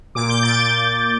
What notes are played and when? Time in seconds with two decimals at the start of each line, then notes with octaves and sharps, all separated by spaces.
0.15 A#2 D6
0.29 G6
0.43 A#2 A6